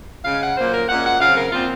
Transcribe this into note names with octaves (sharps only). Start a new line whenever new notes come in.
C#3 G#3 C#4 F5
F#5
A#2 F#3 A#3 C5
A#4
A#2 G#3 C#4 F#5
F#5
C#3 F#3 C4 F5
A#4
A#2 F3 C4 F4